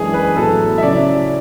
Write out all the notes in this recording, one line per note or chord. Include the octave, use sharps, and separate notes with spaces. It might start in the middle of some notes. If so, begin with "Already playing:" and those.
Already playing: F#2 E3 G#3 D4 G#4
B4
A2 F#3 B3 A4
E5
C#3 F#3 C#4 E4 D5